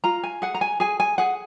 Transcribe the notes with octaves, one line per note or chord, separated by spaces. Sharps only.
F4 A#5
G#5
G#4 F#5
A#5
G#5
G#4 G#5
G#5
G#4 F#5